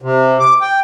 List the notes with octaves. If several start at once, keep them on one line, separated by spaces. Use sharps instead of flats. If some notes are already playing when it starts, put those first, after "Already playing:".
C3
D6
G5